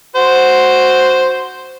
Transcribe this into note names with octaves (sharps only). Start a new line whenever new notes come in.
F#4 C5